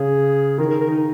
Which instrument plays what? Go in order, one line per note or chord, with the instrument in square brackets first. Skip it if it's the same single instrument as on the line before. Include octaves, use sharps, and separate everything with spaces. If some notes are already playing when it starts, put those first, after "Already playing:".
Already playing: [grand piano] C#3 [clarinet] G#4
[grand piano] D#3 [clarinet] A#4
[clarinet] A#4
A#4
D#4